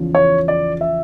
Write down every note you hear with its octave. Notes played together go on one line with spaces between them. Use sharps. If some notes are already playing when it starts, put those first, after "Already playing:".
Already playing: E2 C#3 F3
C#5
D5
E5